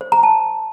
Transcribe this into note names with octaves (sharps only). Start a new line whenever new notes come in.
C5
A#5
A5